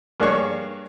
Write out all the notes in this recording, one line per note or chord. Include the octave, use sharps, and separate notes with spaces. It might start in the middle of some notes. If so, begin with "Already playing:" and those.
G2 A#3 D4 G#4 C#5 C#6